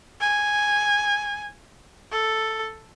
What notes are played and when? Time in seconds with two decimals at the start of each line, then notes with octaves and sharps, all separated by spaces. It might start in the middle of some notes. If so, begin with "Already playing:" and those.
0.21 G#5
2.12 A4